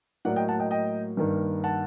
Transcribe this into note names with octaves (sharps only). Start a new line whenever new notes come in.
A2 F#3 A#3 D5 F#5
D#5 G5
F#5 A5
D#5 G5
D#5 G5
G2 D#3 G3 A#3
F#5 A5